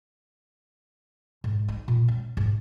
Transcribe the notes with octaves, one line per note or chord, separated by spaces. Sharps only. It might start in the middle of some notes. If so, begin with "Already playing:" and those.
G#2
D#4
A#2
C#4
G#2